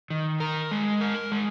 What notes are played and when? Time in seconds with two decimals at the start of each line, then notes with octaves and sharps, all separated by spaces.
0.10 D#3
0.40 A#4
0.71 G#3
1.01 A#4
1.32 G#3